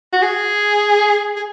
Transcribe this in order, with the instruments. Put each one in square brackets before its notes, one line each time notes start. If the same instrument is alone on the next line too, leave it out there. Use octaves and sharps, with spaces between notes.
[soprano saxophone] F#4
G#4
G#4